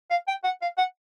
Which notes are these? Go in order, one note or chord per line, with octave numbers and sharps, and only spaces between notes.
F5
G5
F#5
F5
F#5